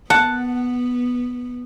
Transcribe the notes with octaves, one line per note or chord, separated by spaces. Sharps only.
B3 F#5 A5